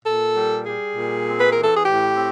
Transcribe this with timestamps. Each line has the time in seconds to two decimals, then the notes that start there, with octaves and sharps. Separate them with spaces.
0.05 A#2 A4
0.36 G3
0.66 G3 G#4
0.96 A#2
1.26 C4
1.40 B4
1.52 E3 A#4
1.63 A4
1.75 G#4
1.86 A2 G4
2.16 C4